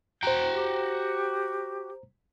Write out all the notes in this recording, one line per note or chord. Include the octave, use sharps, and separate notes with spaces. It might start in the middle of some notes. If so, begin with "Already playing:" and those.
F#4 C5 G5 A#5
G4